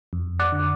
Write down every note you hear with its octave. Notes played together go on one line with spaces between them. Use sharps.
F2
D5 F#5
D3